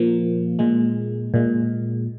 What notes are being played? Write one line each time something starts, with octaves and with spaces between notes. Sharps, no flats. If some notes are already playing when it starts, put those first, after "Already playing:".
Already playing: A#2 F3 A#3
A#2 G#3
A#2 G#3